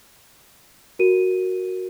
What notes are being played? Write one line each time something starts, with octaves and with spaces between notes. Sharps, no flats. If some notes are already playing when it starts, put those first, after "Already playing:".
F#4 A#4 D#7